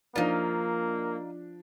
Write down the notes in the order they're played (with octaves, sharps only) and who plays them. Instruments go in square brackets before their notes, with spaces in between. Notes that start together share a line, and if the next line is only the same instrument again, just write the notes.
[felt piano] F3 D4 [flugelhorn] A#3 [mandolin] D#4 F4